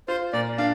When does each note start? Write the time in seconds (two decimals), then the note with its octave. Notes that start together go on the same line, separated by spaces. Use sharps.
0.08 F4 C5
0.33 A#2 D5
0.58 D4 F5